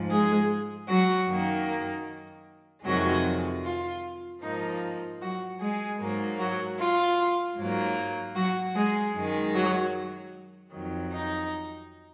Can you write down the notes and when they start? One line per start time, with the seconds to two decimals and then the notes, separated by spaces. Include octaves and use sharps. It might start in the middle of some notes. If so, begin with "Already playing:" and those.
Already playing: G#2 F3
0.09 G#3 G#4
0.88 F#3 F#4
1.28 F#2 D#3 A#3
2.84 F2 C3 D#3 F#3 G#3 F#4
3.64 F4
4.42 G#2 F3 A#3 D#4
5.21 F#3 F#4
5.60 G#3 G#4
6.00 G#2 F#3 A#3
6.39 F#3 F#4
6.78 F4
7.57 G#2 F#3 A#3
8.36 F#3 F#4
8.75 G#3 G#4
9.14 F#2 D#3 G#3
9.54 F#3 F#4
10.72 F2 D#3 F#3
11.12 D#4